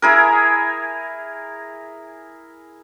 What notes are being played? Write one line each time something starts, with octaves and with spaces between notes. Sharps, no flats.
E4 G#4 A#4